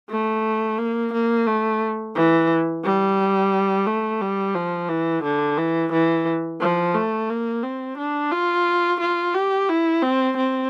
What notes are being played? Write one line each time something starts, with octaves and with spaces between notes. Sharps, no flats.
A3
A#3
A#3
A3
E3
G3
A3
G3
F3
E3
D3
E3
E3
F3
A3
A#3
C4
D4
F4
F4
G4
E4
C4
C4